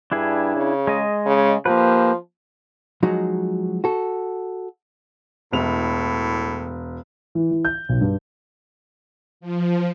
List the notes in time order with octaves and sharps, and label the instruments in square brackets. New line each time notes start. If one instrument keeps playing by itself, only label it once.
[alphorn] G2 [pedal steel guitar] D4 E4 G#4
[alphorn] C#3
[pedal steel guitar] G#3 D#5
[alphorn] C#3
[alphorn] F3 [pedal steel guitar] A#3 G4 B4
[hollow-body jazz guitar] F3 F#3 G#3 D#4 F#4
F#4 A4
[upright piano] E1 F7 [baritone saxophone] A2
[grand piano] E3
E3
G6
B1
G2
[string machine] F3